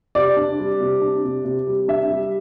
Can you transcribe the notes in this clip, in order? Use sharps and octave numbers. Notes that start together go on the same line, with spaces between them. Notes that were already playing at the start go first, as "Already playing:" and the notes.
C3 D5
D4
G3
C3
D4
C3
C3
G3
D4 E5
G3